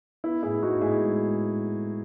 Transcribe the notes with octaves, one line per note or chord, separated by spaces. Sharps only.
B3 E4
A2 E4 G#4
B3 D#4 F#4
A2 E4 G#4
G#3